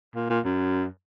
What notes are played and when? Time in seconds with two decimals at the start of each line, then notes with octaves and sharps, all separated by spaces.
0.15 A#2
0.29 A#2
0.45 F#2